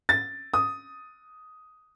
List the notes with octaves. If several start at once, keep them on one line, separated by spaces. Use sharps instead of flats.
A6
D#6